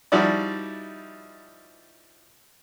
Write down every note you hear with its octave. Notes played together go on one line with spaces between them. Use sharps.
F3 G3 D#4 E4 F#4 D5